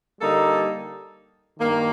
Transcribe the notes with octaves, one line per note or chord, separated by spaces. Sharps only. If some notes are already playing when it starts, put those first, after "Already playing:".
D3 G3 A#3 D#4 A4
G2 D#3 A#3